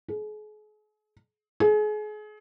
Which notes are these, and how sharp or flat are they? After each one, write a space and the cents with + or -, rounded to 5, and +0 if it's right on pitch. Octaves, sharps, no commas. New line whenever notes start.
G#4 +40
G#4 +35